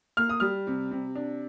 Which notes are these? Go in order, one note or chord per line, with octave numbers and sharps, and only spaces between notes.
A#3 F6
D#6
G3 F6
C3
C3
D4